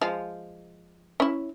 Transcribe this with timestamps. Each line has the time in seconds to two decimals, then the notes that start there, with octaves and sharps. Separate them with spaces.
0.01 F3 G#3 F5
1.20 C#4 E4